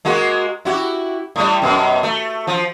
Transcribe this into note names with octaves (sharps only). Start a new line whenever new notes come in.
G#3 A#3 F#4
E4 F#4 G4
A2 G3
F#2 B2
A3
F3